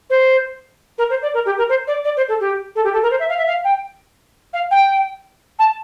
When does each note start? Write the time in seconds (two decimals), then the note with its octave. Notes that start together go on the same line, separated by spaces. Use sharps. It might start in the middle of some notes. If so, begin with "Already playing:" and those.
0.10 C5
0.98 A#4
1.10 C5
1.22 D5
1.34 A#4
1.46 G4
1.58 A#4
1.69 C5
1.87 D5
2.05 D5
2.17 C5
2.28 A4
2.40 G4
2.76 A4
2.84 G4
2.93 A4
3.03 A#4
3.11 C5
3.20 E5
3.29 F5
3.38 E5
3.47 F5
3.64 G5
4.53 F5
4.71 G5
5.59 A5